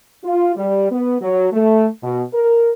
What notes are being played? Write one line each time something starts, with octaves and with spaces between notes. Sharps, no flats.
F4
G3
B3
F#3
A3
B2
A#4